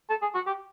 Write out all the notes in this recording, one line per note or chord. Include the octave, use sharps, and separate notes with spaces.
A4
G#4
F#4
G4